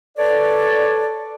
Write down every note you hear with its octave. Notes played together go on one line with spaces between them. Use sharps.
A4 B4 C#5 D5